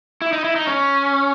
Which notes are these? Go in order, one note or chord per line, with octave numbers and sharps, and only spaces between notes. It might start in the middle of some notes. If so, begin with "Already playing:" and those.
E4
D#4
E4
D#4
C#4